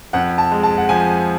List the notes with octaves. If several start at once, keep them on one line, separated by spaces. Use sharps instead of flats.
F2 F#5
A5
G#3
A5
F#5
F3 G#5